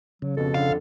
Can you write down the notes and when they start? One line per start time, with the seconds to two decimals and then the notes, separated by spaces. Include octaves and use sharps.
0.22 C#3 F#3
0.37 F2 B2 A4
0.54 F2 D3 F5